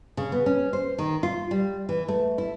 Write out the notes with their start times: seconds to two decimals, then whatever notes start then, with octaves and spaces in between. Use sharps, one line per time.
0.17 C#3
0.32 B3
0.46 C#4
0.73 C5
0.98 D#3
1.23 F4
1.51 G3
1.89 E3
2.08 A3
2.38 E4